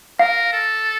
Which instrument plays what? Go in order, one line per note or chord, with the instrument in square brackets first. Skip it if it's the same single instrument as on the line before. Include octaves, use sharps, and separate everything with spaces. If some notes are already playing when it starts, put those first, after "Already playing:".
[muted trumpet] A#4 [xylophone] F5
[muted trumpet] A4